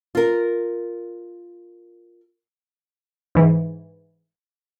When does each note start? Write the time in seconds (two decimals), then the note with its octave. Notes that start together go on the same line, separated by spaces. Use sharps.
0.15 F4 A#4
3.35 G#2 E3